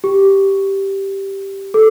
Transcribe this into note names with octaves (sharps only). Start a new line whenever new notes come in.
G4
A4